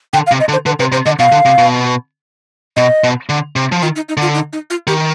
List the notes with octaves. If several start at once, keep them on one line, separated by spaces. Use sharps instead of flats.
D3 G5
F5
C3
D#5
D3
C5
D3 B4
C3 B4
C3 C5
D3 D#5
B2 F5
D3
C3
B2
B2 D#5
B2
D3
C3
F3
D#3 F4
D#4
D#4
D3 F4
D#4
D#4
F4
D#3 G4